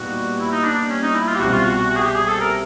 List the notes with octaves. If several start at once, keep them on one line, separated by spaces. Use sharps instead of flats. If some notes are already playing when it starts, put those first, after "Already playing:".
Already playing: A#2 G3 B3 D#4 F#4
E4
D#4
D4
C#4
D#4
E4
F4
G4
C2 B2 G3 C4 F#4
F4
F#4
F#4
F#4
G#4
G4
G#4
A4
A#4